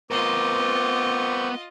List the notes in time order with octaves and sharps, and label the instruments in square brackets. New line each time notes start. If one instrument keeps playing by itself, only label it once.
[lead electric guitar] B3 A#4 [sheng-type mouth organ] C4 C#6 [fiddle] F4 D#5 [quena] D6